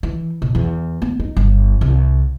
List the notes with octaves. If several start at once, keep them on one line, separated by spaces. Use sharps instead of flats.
E3
B2
E2
B3
D#4
G1
C2